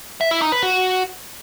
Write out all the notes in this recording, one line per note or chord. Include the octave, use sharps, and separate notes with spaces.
E5
E4
D#4
B4
F#4